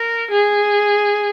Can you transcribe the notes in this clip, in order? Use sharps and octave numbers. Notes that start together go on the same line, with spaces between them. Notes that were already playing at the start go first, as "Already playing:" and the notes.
Already playing: A#4
G#4